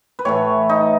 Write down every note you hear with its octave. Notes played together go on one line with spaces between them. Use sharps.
B4
A2 E3 A3 C#5
D#4